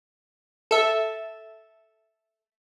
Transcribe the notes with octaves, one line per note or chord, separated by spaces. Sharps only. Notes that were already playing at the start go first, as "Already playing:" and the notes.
A4 E5